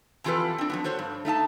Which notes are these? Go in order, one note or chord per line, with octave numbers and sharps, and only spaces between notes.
F2 E3 F4 G4 A4 B4
C4 D4
F3 F#3 B3
F#4 A4 C5 C#5
G2
A3 D#4 E5 A5